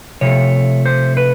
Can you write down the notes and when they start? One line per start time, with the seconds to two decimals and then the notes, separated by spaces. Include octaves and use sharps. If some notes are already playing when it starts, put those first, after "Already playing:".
0.21 C3 F3 A3 C#5
0.86 C5
1.17 B4